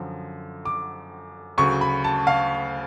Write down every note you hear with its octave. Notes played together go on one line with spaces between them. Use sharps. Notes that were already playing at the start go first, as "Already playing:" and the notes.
Already playing: F#2 D3 F3
D6
D2 C#3 F#3 C#6
B5
A5
F5